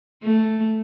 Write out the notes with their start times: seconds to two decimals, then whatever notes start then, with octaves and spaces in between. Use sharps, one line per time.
0.24 A3